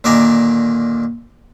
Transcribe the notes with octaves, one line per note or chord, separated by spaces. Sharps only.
A#2 D3 D#3 D5 G#5 A#5